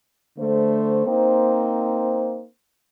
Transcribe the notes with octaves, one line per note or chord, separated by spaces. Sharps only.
D3 A3 C5
A#3 C4 D#4 C5